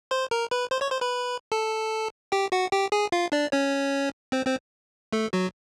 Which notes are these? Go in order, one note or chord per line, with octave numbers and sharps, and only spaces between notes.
C5 C6
A#4 A#5
B4 B5
C5 C6
C#5 C#6
C5 C6
B4 B5
A4 A5
G4 G5
F#4 F#5
G4 G5
G#4 G#5
F4 F5
D4 D5
C#4 C#5
C4 C5
C4 C5
A3 A4
F#3 F#4